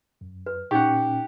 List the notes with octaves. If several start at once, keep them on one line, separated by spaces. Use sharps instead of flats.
F#2
B4
A#2 C#4 D#4 G4 F#5 G5 C#6